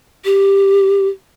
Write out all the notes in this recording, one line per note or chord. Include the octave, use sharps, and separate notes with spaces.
G4